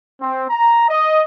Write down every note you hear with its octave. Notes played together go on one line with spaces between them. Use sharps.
C4
A#5
D#5